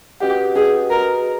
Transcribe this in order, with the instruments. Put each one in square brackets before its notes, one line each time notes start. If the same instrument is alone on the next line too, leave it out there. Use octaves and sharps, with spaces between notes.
[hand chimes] C#4 F#4 B4 D#5 F#5 [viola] G4
[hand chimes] C#4 F#4 B4 D#5 F#5 [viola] G#4
[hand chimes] F#4 B4 D#5 [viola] A#4